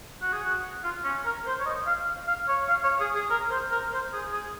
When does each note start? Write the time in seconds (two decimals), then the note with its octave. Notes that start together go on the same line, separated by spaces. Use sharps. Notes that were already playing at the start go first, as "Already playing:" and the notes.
0.22 F#4
0.33 G#4
0.43 F#4
0.83 F4
1.04 C#4
1.25 A#4
1.46 C5
1.60 C#5
1.66 D#5
1.87 F5
2.27 F5
2.48 C#5
2.69 F5
2.84 C#5
3.00 G#4
3.15 G#4
3.30 A#4
3.50 C5
3.71 A#4
3.92 C5
4.13 G#4
4.32 G#4